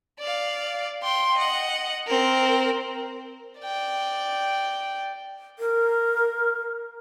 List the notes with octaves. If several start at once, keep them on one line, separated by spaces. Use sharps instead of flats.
D5 F5
G5 C6
D#5 F#5
C4 A#4
D5 G5
A#4